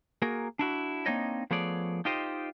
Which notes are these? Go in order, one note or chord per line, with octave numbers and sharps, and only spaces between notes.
A#3 F#4 G#4 A#4
D4 E4 F#4
A#3 C4 D4 D#4 C#5 D#5
F3 A3 B3 G#4 C#5 D5
D#4 F4 G4 C5 D#5